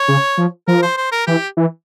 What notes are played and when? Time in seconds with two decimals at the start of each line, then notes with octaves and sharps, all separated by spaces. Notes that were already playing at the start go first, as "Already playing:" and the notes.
Already playing: C#5
0.08 C#3
0.37 F3
0.68 F3 A#4
0.82 C5
0.97 C5
1.12 A#4
1.27 E3 G4
1.57 E3